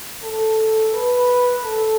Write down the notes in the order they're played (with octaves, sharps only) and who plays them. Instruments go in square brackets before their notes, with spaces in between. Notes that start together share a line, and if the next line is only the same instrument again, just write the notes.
[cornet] A4
B4
A4